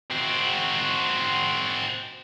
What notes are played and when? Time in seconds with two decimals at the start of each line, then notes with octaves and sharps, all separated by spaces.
0.11 C4 F#4